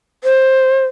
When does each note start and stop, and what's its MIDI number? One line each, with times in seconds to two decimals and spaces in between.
0.24 0.86 72